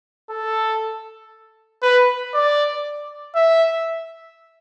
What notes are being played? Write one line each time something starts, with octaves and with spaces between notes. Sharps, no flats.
A4
B4
D5
E5